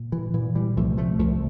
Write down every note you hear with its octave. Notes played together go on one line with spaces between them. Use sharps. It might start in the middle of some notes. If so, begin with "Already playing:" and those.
Already playing: A#2
E3
A#2 E3
E3 G3
C2 F3 A3
F3 A3
C2 F3 A3